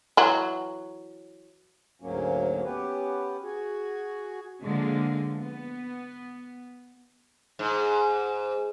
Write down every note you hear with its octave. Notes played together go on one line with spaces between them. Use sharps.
E3 F#3 F#4
D2 G#2 F#3 A#3 C#4
B3 C#4 G4 B4
F#4 G#4
D3 F3 G#3 A#3
B3
G#2